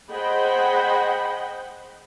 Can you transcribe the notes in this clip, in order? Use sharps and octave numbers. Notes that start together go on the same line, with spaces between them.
G#4 C5 D#5 F#5 G5 B5